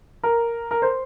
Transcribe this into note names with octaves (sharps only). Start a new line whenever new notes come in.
A#4
A#4
C5